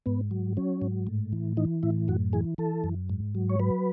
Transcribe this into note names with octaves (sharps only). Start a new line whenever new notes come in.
G#2 B3
F#3
F#3 C#4
G#2
A2
E3
E3 D#4
A2 E4
F#2 F#4
E3 G#4
E3 A4
F#2
G#2
F#3
C#5
F#3 B4